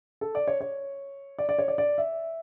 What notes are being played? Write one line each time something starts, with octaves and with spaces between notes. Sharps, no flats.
A4
D5
C#5
C#5
D5
D5
C#5
D5
D5
E5